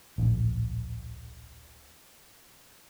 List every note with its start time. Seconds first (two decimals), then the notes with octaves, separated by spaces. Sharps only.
0.18 D1 A#1